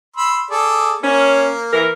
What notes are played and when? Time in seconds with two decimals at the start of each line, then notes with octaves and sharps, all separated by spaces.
0.17 B5 C6 E6
0.51 G#4 A4 D5
1.03 A#3 C#4
1.73 E3 A#4